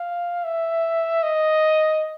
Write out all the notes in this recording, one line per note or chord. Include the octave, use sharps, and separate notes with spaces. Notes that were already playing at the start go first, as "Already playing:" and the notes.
Already playing: F5
E5
D#5